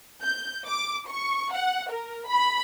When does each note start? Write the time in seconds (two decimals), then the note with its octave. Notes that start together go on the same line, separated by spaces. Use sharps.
0.22 G6
0.66 D6
1.09 C#6
1.53 F#5
1.91 A#4
2.28 B5